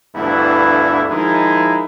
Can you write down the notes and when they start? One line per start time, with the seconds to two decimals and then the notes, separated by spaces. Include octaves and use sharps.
0.14 D2 G2 E3 B3 E4
1.08 D#3 F3 G#3 D#4 E4